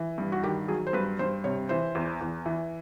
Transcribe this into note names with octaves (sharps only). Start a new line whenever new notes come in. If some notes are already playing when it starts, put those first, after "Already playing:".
Already playing: E3
G2
F#4
D#3 G4
F#3 G#4
C5
G2 B4
G2 C5
C3 C#5
E3 C5
E2
E2
E3